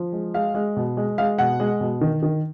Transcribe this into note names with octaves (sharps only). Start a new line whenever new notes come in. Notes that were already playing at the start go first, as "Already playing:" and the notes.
Already playing: F3
G#3
G#3 F5
G#3
B2
G#3
G#3 F5
B2 F#5
G#3
B2
D#3
D#3